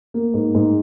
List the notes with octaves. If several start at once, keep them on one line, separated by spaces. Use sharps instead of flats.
A#3
G#2
G#2